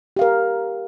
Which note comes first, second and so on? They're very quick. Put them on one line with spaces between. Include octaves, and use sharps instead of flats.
G4 F5 A#4